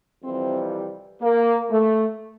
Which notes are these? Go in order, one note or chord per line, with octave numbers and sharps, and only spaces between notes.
F2 C3 E3 G3 C4
A#3
A3